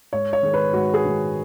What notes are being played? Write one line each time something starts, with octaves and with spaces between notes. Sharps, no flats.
G#2 C#5
C#5
D#3 G#3
B4
G#2 F#4
G#4
D#3 G#3